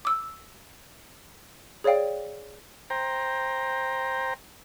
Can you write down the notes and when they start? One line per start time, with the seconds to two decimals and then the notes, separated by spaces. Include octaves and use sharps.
0.05 D6 E6
1.84 G#4 C#5 D5 F5 G5
2.90 C5 G5 A#5